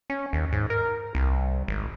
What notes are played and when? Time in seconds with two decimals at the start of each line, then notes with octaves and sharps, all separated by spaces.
0.10 C#4
0.33 D#2
0.52 G#2
0.70 A#4
1.15 C2
1.68 G#1